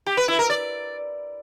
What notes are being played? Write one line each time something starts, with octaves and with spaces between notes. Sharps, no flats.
G4
B4
E4
A#4
D5